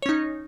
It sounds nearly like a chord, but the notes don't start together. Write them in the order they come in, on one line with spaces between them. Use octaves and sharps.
C#5 C#4 D#4